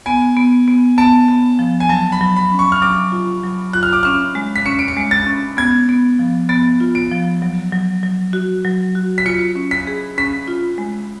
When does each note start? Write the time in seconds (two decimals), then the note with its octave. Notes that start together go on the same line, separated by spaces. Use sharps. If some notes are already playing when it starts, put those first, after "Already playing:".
0.06 B3 G#5
0.37 B3
0.68 B3
0.98 B3 A5
1.28 B3
1.59 F3
1.80 G#5
1.89 F#3 A5
2.12 B5
2.21 F#3
2.36 B5
2.52 C#4
2.59 C#6
2.72 F6
2.82 F#3 D6
3.12 F4
3.43 F#3
3.73 F4 F#6
3.83 F6
3.93 D6
4.03 C#4 F6
4.35 G#3
4.56 B6
4.66 C#4 C#7
4.79 D7
4.88 C#7
4.97 G#3
5.11 A6
5.27 C#4
5.57 B3 G#6
5.89 B3
6.19 F3
6.49 B3 A6
6.80 F4
6.95 D7
7.11 F3
7.42 F#3
7.72 F#3
8.03 F#3
8.33 F#4
8.64 F#3
8.95 F#4
9.18 B6
9.26 F4 C#7
9.55 C#4
9.71 B6
9.87 G#4
10.18 C#4 B6
10.48 F4
10.78 G#3